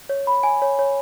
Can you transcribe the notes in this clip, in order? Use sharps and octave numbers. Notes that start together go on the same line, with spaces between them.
C#5
B5
G#5
C#5
C#5